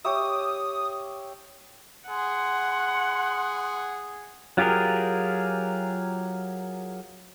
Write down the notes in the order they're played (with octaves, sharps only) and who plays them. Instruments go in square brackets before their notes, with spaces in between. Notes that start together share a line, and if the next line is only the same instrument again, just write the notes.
[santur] G4 C#5 E5 [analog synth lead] D#6
[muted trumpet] G#4 [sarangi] F#5 [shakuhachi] C6
[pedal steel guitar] F#3 F4 G4 G#4 A#4